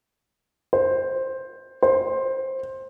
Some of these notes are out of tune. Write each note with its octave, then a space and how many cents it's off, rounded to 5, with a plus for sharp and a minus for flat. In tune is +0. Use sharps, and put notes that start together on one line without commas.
C5 +10
C5 +15